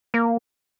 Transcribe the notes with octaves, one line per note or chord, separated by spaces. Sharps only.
A#3